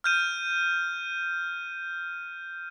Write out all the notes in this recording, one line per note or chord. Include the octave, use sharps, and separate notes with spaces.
F6 G6 D#7